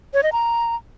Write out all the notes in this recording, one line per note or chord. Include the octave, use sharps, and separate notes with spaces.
C#5
D#5
A#5